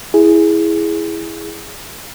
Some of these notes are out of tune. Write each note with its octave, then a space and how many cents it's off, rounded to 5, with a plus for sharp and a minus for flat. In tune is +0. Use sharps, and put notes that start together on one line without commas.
E4 +0 G#4 +0